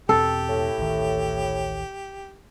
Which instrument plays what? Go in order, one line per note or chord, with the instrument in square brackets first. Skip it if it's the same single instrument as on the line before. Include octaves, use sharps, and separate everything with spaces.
[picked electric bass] E2 B2 C4 [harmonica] G4 [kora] A4
[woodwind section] A2
[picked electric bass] A1 D2 D#3